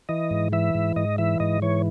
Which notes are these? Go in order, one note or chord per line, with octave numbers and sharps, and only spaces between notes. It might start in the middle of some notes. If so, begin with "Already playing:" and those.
E3 D#5
G#2
E3 E5
G#2
G#2 D#5
E3 E5
G#2 D#5
E3 C#5